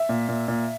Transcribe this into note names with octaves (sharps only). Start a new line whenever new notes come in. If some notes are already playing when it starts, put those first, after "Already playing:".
Already playing: E5
A#2
A#2
A#2